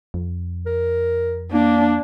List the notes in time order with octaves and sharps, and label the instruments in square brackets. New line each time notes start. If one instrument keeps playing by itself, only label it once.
[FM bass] F2
[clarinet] A#4
[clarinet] A#3 [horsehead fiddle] D4